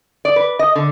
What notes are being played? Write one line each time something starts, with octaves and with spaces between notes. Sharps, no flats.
D5
B4
D#5
D3